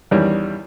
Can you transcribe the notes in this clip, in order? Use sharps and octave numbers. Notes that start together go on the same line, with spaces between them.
E2 D#3 G3 C#4